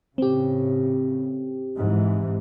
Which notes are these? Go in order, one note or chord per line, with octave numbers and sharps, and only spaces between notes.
A2 C#3 C4 G4
G#2 E3